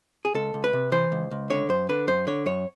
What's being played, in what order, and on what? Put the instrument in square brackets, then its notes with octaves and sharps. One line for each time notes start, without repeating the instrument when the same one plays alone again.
[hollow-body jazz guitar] G#4
C#2 A4
C#2
B4
C3
E3 C5
C#2
C#2
D3 C#5
F#2 C5
D3 B4
F#2 C5
D3 C#5
F#2 C#5